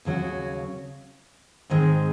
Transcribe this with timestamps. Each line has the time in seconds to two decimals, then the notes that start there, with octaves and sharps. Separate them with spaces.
0.05 D#2 C#3 F#3 C#4 F#4
1.70 G#2 D#3 G#3 C4